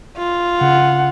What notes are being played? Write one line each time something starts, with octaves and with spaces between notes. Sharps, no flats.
F4
C#3 F#5